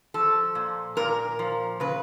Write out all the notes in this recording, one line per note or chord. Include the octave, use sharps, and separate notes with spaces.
F3 A4
A#2
A#2 A#4
F3
C#3 B4